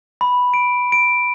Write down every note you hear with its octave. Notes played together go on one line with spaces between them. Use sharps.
B5
D7
D7